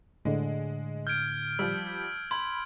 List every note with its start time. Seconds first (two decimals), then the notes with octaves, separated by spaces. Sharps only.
0.25 A2 D3 G#3
1.07 F6 G6 G#6 D7
1.59 F3 G3 E6
2.31 B5 C6 G#6